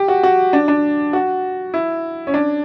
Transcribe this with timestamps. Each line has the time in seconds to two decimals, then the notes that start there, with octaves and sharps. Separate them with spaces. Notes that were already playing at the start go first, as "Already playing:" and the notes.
Already playing: G4
0.08 F#4
0.23 F#4
0.53 D4
0.68 D4
1.13 F#4
1.74 E4
2.27 C#4
2.34 D4